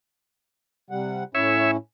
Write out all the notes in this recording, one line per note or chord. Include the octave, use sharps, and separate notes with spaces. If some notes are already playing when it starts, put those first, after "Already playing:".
C3 G3 F#5
A2 C#4 E4 C#5 E5